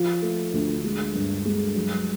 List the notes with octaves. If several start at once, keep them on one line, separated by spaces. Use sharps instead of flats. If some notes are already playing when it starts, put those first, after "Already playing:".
Already playing: F3
A3
D2
G#3
G2
G#3
F#3